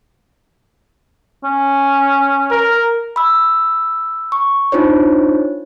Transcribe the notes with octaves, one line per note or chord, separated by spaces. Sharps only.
C#4
A#4
B5 E6
C#6
D4 D#4 F4 C5 C#5